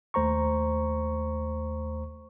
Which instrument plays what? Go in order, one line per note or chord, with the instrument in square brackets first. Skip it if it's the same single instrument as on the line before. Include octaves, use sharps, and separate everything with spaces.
[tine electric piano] D#2 A3 C5 A#5 C#6